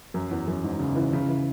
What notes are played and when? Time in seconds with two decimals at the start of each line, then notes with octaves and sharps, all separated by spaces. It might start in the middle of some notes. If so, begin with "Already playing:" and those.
0.14 F#2
0.31 E2
0.48 F#2
0.64 G#2
0.80 C#3
0.96 E3
1.13 C#3
1.28 E3